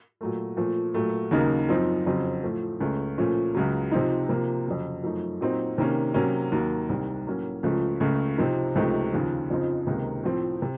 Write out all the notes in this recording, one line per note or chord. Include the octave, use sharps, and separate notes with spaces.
A#2 F#3 A3
A#2 F3 A3
A#2 F#3 A3
D#2 C#3 F#3 A#3 D#4
F#2 F3 C4 D#4
F2 C#3 F#3 C4
A2 F3 A3
C#2 C#3 A3 C#4
A#2 F3 A3 C#4
C#2 C#3 F#3
C3 F3 C4 D#4
C3 F3 A#3
F2 C#3 F#3
F#2 F3 A3 D#4
A#2 F#3 C4 D#4
C3 D#3 A#3 C#4
C3 F#3 A#3 C#4
D#2 D#3 F#3 A#3
C2 C3 D#3
A2 F#3 A#3 C#4
C#2 C#3 F3 A3
C#2 C#3 A3
C3 F3 C4 D#4
C#2 C3 F3 A3 D#4
D#2 C#3 F3
F2 C#3 F3 C4 D#4
C#2 C3 D#3 A#3 D#4
A2 F3 C4
C3